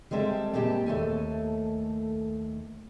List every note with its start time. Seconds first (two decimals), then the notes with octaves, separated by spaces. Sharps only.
0.11 G3 G#3 C4 A4 E5
0.53 A#2 G#3 C4 G4 A5
0.86 D#2 A3 A4 G#5